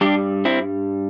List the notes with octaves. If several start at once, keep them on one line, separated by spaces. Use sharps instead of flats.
G2 G3 D4 G4
C4 E4